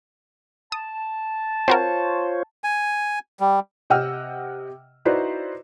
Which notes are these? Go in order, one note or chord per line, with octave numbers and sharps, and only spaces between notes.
A5 D#6
C4 F4 F#4 A#4 C5 C#5
G#5
G3
C3 D#5 F#5 G5 E6 F6
D#4 E4 F#4 B4 C5 D5